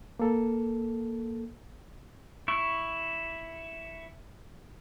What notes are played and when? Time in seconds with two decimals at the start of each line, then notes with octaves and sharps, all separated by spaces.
0.19 A#3 A4
2.48 E4 C#6